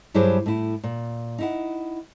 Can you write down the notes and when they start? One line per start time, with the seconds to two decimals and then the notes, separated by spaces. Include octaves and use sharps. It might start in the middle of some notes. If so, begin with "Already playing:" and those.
0.14 G2 F#3 E4 G4 G#4 C5
0.46 A2 E4
0.84 A#2
1.38 D#4 E4 F#5